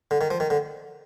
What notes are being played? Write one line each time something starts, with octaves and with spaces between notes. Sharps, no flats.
D3
D#3
F3
D#3
D3